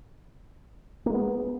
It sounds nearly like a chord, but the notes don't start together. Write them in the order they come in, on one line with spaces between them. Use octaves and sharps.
A#3 G#3 B3